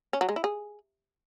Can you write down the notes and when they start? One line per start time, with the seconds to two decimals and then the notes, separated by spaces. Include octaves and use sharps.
0.13 C#4
0.21 F#3
0.29 G#3
0.36 E4
0.44 G#4